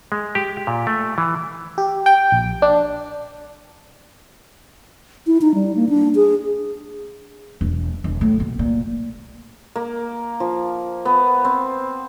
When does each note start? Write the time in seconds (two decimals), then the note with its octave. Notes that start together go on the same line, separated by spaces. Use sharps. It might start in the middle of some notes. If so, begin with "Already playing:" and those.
0.12 G#3
0.35 G4
0.67 A#2
0.87 A3
1.18 E3
1.78 G4
2.06 G5
2.32 A#1
2.62 D4
5.27 E4
5.41 D#4
5.55 G3
5.76 A#3
5.89 D4
6.15 G#4
7.61 E1
8.04 E1
8.21 A2
8.40 B2
8.59 A#2
9.76 A#3
10.40 F3
11.05 B3
11.45 C4